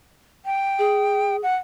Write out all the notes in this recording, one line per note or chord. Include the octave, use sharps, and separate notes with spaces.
G5
G#4
F#5